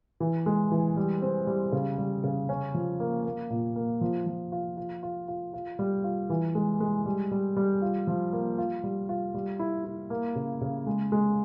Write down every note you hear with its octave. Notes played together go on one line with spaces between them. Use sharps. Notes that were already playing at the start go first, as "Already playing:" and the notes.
E3
G#3
E3
G3
C4
G3
C#3
G3
C#3
C#4
F3
A#3
A#3
A#2
A#3
F3
F3
F4
F4
F4
F4
F4
G3
F4
E3
G#3
G#3
G3
G3
G3
F4
F3
A#3
F4
G3
F4
G3
E4
E4
A#3
C#3
C#3
G#3
G#3